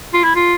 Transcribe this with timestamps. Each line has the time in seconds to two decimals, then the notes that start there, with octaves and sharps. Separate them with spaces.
0.13 F4
0.24 E4
0.36 F4